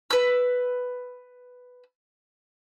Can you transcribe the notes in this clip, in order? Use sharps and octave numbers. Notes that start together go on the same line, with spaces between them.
B4 E6